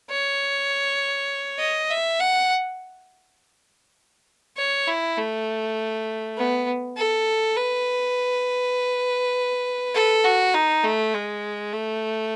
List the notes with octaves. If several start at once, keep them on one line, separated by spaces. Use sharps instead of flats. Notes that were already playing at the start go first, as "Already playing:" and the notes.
C#5
D#5
E5
F#5
C#5
E4
A3
B3
A4
B4
A4
F#4
D#4
A3
G#3
A3